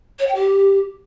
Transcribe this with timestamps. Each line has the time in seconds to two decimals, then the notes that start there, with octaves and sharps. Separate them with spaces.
0.19 C#5
0.27 G5
0.35 G4